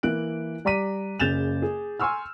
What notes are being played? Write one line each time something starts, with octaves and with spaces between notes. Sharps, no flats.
E3 A#3 E4 F#6 D7
G3 D5 A#5 D6 B6 D#7
F#1 C#3 G6 A6 E7 F7
G#4
G#5 C6 C#6 E6 F6